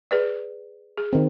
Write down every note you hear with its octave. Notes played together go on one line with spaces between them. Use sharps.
G#4 B4 D5
G#4
D#3 C4